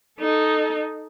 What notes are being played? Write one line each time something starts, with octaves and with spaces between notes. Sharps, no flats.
D#4 A4